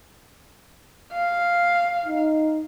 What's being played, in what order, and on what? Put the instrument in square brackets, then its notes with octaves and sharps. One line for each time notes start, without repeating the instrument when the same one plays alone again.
[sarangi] F5
[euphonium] D#4